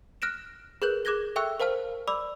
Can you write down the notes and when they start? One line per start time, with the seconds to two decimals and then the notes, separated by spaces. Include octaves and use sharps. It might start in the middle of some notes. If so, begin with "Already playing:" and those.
0.22 F6 F#6 A#6 D7 E7
0.82 G#4 A#4 B4 F#6 G6 F#7
1.05 G#4 D6 F#6 G#6 A#6 G7
1.36 A4 E5 G5 C#6 E6 F#6
1.60 A#4 C5 F5 A5 F6
2.08 D5 B5 D6 E6